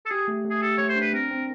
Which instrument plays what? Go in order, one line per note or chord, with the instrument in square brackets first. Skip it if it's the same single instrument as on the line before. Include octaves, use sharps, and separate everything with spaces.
[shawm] A4
[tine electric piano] G4 [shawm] G#4
[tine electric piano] A3
A3
[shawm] G#4
[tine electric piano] G4 [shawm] A4
[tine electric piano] A3 [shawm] C#5
[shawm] C5
[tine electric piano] D4
[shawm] B4
[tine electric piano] C4 [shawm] A#4
[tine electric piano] C4